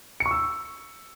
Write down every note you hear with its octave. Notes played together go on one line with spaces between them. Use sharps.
C#7
C#6
E6